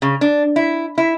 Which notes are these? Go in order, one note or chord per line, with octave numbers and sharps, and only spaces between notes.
C#3
D4
E4
E4